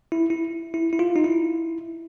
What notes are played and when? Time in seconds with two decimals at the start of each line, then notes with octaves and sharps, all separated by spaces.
0.12 E4
0.30 E4
0.74 E4
0.93 E4
0.99 F4
1.16 D#4
1.24 E4